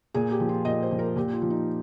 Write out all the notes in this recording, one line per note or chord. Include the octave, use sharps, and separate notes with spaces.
A#2 G#4
G4
F3
F4
A#2 D#5
C5
F3
A#4
A#2 G4
F4
F3
D#4